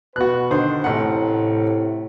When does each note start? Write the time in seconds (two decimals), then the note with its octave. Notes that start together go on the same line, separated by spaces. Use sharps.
0.16 B2 F#4 B4 F#6
0.51 D3 D#3 C5
0.84 A1 A2 C3 F#5